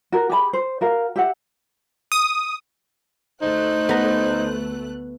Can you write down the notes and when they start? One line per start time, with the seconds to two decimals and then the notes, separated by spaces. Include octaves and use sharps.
0.12 F#4 A#4
0.29 G4 G#4 A5 B5
0.53 C5
0.81 F#4 A#4 F5
1.16 G4 E5 F#5
2.12 D#6
3.42 D2 A3 D#4 C5 F#6
3.89 B3 A#5